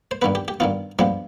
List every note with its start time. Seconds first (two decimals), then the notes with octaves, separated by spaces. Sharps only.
0.11 C5
0.22 G2 D#3 B3 B4
0.35 G4
0.48 G4
0.60 G2 D#3 B3 F4
0.99 G2 F3 G#3 B3 G4